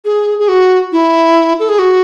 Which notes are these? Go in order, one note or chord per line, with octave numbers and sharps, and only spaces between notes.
G#4
G#4
F#4
E4
A4
G#4
F#4